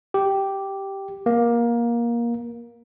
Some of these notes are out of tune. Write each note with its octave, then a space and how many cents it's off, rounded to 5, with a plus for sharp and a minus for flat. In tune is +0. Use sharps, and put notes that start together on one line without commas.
G4 -5
A#3 +20